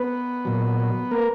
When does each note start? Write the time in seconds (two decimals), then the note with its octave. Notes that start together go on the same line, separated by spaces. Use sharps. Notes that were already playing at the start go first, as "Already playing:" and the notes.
Already playing: B3 B4
0.45 A#2 F#3
1.11 A#3 A#4